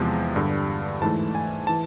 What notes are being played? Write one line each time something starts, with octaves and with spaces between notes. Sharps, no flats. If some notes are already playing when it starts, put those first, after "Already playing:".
Already playing: E2 C3 F3 G#3
G2 D3 G3
G#2 E3 A3 A5
G#5
E3 A5